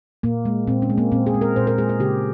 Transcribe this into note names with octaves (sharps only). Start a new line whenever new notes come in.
A#2 A#3
G#3
A#2 C4
C#4
G#3
A#3
A#2 C4
G#4
G#3
A#4
A#2 C5
A#4
G#3 G#4
G#4
C#3 G4